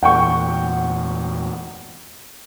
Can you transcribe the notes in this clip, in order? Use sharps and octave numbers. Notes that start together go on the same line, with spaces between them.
E2 A#2 F#5 G5 C#6